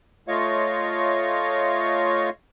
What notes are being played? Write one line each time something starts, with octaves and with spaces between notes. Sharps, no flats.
A3 F4 C#5 D#5 F5 C#6